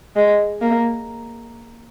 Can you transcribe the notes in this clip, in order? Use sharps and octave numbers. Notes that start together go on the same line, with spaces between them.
G#3
A#3